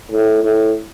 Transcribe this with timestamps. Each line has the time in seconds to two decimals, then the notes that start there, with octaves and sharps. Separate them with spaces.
0.12 A2
0.43 A2